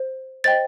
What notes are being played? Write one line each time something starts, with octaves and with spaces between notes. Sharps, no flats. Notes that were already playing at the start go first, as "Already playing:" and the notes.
Already playing: C5
C5 D#5 G5 A6